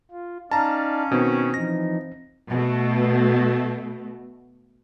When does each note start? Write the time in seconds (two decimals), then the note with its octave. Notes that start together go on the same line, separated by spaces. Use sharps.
0.11 F4
0.51 C#4 D#4 D5 F5 A5 A#5
1.11 B2 D#3 C4 C#5
1.54 E3 F3 D#4 A#6
2.50 B2 A3